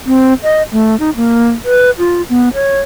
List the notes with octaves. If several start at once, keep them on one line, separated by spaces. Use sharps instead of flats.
C4
D#5
A3
D#4
A#3
B4
F4
B3
C#5